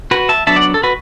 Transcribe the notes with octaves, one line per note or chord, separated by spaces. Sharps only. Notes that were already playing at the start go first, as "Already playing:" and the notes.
F#4 B4
E5 A5
F#3 B3 D4 E5 A5
D5 F#5
A4
F#4 B4